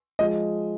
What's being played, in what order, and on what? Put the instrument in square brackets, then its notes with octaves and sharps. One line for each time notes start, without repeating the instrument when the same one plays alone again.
[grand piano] F3 G#3 D#5